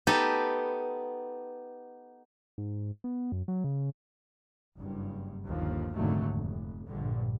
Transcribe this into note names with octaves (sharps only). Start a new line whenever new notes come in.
B3 D#4 G4 A4 B4
G#2
B3
F#2
F#3
C#3
F#1 G2
G1 D#2 F3
F1 D#2 G#2 D3 F#3 A3
F1
A#1 G2 D3